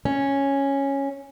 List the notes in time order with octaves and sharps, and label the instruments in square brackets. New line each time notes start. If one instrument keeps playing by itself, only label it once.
[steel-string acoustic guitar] C#4